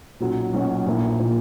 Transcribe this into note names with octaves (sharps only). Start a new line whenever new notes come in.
B1 A#2 F#3 C#4
B1 A#2 F#3 C#4
A#1 A#2 A#3 E4
A#2 A#3 E4